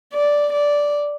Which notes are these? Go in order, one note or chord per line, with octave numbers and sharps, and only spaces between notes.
D5
D5